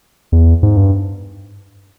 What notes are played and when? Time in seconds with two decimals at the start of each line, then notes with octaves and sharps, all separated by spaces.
0.32 E2
0.63 G#2
0.77 G2